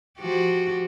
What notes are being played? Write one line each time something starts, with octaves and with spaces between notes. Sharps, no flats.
F3 F#4 G4